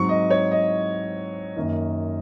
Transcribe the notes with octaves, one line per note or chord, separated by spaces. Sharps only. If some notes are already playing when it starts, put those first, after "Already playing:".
Already playing: G#2 F#3 C4 C#6
D#5
C#5
D#5
F#2 D#3 A#3